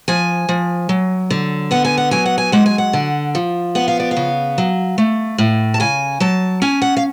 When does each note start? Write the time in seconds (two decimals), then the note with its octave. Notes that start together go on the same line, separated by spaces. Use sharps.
0.08 F3 G#5
0.49 F3
0.89 F#3
1.30 D3
1.71 B3 F#5
1.85 G#5
1.98 F#5
2.11 F#3 G#5
2.26 F#5
2.38 G#5
2.52 G#3 F#5
2.66 G#5
2.78 F#5
2.93 D3
3.35 F3
3.75 B3 F#5
3.88 F5
4.00 D5
4.11 F5
4.16 C#3
4.58 F#3
4.98 A3
5.38 A2
5.74 A5
5.80 C#3 G#5
6.20 F#3 A5
6.62 C#4 G#5
6.82 F#5
6.97 F5